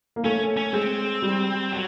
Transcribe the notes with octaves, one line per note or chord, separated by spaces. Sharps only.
A#3
A3 C#4
C#4
G#3 C4
G3
F#3